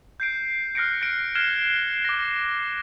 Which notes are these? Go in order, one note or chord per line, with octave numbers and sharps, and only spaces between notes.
G6 C7 D7
F6 F#6 A#6 C#7 D7
A#6 D7
F6 F#6 G#6 C7 E7 G7
D6 A#6